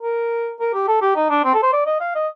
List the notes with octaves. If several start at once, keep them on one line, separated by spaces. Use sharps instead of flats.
A#4
A#4
G4
A4
G4
D#4
D4
C4
A4
C5
D5
D#5
F5
D#5